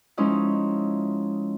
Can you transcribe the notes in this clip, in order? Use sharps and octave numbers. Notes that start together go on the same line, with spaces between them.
F3 G#3 C#4 D#4 E4